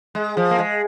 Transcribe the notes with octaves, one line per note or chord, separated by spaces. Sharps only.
G#3
F3
A#3
G#3